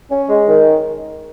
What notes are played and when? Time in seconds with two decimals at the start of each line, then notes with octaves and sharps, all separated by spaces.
0.10 C#4
0.29 G#3
0.48 D#3